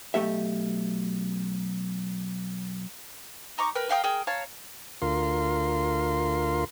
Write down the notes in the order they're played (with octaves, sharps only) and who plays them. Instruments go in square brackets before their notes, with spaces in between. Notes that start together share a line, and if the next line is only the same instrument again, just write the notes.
[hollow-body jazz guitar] B1 G2 A3 G4 E5
[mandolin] D#4 A#5 C#6 D6
A#4 B4 G5
A#4 F5 G5 D#6
G#4 A#4 G5
C#5 F5 A5 A#5
[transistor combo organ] D2 F4 A#4 C6